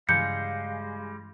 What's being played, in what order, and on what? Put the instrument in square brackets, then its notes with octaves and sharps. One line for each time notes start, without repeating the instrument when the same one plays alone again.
[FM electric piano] G2 C#3 E3 [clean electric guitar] G3 G#3 [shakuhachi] F5 [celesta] G6 C#7